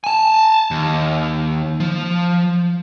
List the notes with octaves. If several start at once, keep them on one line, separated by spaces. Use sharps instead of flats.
G#5 A5
D#2
F3